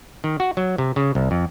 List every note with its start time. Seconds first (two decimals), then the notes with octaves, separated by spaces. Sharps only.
0.24 D#3
0.40 F#4
0.57 F#3
0.78 C3
0.96 C#3
1.15 C2
1.31 F2